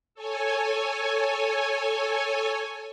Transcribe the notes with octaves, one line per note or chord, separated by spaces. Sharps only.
A4 C#5 G#5